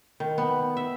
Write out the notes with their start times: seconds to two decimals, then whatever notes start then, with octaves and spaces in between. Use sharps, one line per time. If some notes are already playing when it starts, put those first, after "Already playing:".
0.20 D#3
0.38 B3
0.77 E5